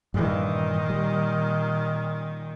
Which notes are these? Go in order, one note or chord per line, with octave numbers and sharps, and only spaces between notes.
G2 A#2 D#3 E3
G3